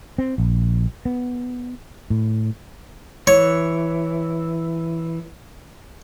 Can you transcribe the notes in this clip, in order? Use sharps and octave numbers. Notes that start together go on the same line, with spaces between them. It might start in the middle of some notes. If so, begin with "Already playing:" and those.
C4
A#1
B3
A2
E3 C#5